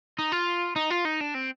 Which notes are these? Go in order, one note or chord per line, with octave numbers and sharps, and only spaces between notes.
D#4
F4
D#4
F4
D#4
D4
C4